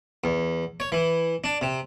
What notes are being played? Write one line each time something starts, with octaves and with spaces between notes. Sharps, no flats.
E2
C#5
E3
D4
C3